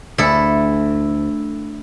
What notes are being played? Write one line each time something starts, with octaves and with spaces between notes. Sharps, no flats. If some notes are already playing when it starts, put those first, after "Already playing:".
D2 E4 A4